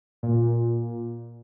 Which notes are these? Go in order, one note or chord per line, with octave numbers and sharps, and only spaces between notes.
A#2